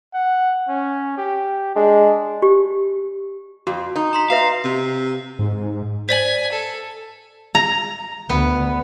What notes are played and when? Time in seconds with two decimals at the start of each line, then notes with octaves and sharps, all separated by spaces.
0.14 F#5
0.68 C#4
1.18 G4
1.76 G#3 D4
2.42 G4
3.67 F2 F#4
3.96 D#4
4.13 A#5 C6 B6
4.30 F#4 B4 E5 F5 A#5
4.65 C3
5.39 G#2
6.09 C5 D5 G#5 B6 F#7
6.52 A4
7.55 A#5
8.29 D2 B3